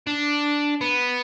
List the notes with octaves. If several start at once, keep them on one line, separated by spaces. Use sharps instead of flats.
D4
B3